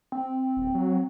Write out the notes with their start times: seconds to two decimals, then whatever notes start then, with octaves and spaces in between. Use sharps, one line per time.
0.12 C4
0.57 D#1
0.74 F#3